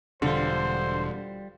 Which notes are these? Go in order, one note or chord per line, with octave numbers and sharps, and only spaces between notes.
E1 D3 G3 F4 C5